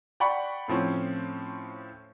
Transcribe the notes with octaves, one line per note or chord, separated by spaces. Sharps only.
D5 F#5 G5 B5 C#6
A2 F3 C4 C#4